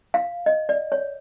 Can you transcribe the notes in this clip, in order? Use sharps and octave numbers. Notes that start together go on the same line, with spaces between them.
F5
D#5
D5
C#5